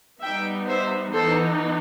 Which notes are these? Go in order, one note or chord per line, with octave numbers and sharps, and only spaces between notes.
G3 B3 D#4 E5 G5
C5 E5
E3 B3 D#4 A4 C5